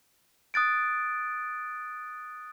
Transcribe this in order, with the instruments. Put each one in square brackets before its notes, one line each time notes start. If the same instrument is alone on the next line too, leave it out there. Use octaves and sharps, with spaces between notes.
[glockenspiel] D#6 F#6 A6 D7